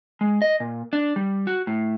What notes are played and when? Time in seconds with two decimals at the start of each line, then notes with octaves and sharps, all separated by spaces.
0.21 G#3
0.42 D#5
0.60 A#2
0.93 D4
1.16 G3
1.47 F#4
1.67 A2